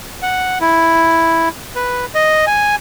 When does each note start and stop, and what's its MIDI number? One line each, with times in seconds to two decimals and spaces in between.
0.22 0.58 78
0.61 1.49 64
1.76 2.05 71
2.15 2.45 75
2.47 2.76 80